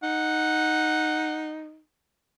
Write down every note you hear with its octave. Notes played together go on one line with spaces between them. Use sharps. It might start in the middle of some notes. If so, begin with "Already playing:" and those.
D#4 F#5